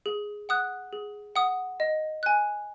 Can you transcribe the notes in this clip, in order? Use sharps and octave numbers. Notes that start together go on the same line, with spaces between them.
G#4
F#5 D#6 F#6
G#4
F#5 D#6
D#5
G#5 F#6